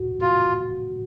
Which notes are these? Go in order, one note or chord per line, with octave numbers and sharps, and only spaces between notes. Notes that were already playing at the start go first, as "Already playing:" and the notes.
Already playing: F#4
F4 F#4